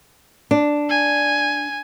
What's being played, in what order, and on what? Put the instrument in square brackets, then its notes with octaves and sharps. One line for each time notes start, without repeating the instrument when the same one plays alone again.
[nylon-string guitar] D4
[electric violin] G#5